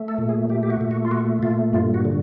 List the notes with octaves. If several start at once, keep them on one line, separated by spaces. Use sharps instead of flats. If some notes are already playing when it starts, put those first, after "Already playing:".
Already playing: A3
A4
A#2
G#4
A3 G4
G4
F#4
A#2
F#4
F4
A3 F#4
A#2 F4
G2 F4
F#4
D3